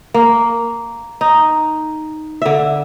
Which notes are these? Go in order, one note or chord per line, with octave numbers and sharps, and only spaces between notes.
A#3
D#4
D3 E5